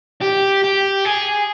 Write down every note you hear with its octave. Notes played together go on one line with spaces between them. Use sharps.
G4
G4
G#4